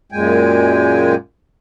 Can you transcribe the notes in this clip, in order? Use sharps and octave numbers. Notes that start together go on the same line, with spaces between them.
F#2 A#2 G#3 G5 G#5